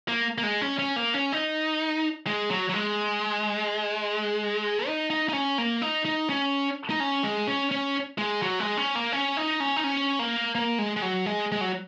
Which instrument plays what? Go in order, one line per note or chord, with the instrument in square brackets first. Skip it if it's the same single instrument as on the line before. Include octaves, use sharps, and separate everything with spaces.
[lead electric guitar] A#3
A#3
G#3
C#4
C#4
A#3
C#4
D#4
G#3
F#3
F#3
G#3
D#4
D#4
D#4
C#4
A#3
D#4
D#4
C#4
D#4
C#4
G#3
C#4
C#4
G#3
F#3
G#3
C#4
A#3
C#4
D#4
C#4
D#4
C#4
A#3
A#3
G#3
G#3
F#3
G#3
G#3
F#3